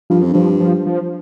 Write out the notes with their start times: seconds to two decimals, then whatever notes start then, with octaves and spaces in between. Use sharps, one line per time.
0.10 G2 F3
0.22 F2
0.33 G2 F3
0.60 F3
0.86 F3